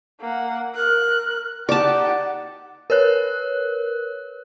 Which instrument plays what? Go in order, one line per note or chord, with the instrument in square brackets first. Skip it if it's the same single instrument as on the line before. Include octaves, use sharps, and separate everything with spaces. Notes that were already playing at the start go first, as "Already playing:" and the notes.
[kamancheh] A#3 F#5
[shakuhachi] A#4 [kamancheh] F#6
[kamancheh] D#4 G4 [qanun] D5 A5 [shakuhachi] F#5
[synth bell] A#4 B4 C#5 F#6